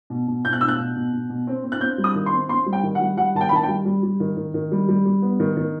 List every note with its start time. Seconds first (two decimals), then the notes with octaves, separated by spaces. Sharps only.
0.10 B2
0.28 B2
0.44 B2 G6
0.53 F#6
0.61 B2 E6
0.68 F#6
0.79 B2
0.96 B2
1.13 B2
1.29 B2
1.47 C4
1.64 C4
1.72 F#6
1.81 C4 G6
1.98 G3
2.04 D#6
2.15 D#3
2.26 C6
2.32 C4
2.49 C4 C6
2.66 G3
2.73 G5
2.83 D#3
2.95 F#5
3.01 G3
3.17 G3 F#5
3.35 D#3 A5
3.41 G5
3.49 B5
3.52 D#3 A5
3.63 G5
3.68 G3
3.85 G3
4.03 G3
4.20 D#3
4.37 D#3
4.54 D#3
4.72 G3
4.89 G3
5.05 G3
5.22 B3
5.40 D#3
5.57 D#3